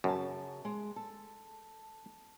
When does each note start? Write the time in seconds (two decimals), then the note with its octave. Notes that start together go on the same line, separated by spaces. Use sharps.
0.04 F#2 C#3 A5
0.65 G#3
0.96 A4